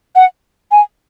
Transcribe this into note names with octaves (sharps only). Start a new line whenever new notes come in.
F#5
G#5